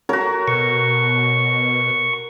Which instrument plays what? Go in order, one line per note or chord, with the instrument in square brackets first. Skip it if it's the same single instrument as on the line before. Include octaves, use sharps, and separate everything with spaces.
[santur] F#4 C#5 [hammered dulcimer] A#4
[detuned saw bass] B2 [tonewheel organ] C#6